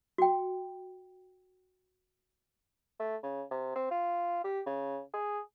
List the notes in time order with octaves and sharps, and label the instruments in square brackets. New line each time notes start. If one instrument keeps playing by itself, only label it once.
[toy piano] F#4 G5
[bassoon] A3
C#3
C3
C4
F4
G4
C#3
G#4